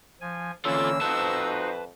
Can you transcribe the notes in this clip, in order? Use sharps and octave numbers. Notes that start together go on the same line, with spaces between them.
F3 G#5
D3 E3 A#3 C#4 F4 A4 E6
F2 D#4 F#4 B4 C5 A5